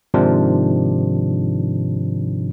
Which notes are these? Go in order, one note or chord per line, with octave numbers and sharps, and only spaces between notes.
G#2 C3 D#3 F3 D4